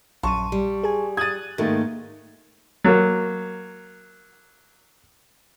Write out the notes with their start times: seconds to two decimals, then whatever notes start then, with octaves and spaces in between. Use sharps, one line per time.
0.23 A#1 F#2 A5 C6 C#6 D#7
0.52 G3
0.84 G#4 G#5
1.17 D#6 F#6 G#6 A6 D#7
1.58 G#2 D#3 A3 A#3 A6
2.84 F#3 A#3